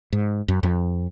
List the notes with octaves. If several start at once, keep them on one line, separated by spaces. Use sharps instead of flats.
G#2
F#2
F2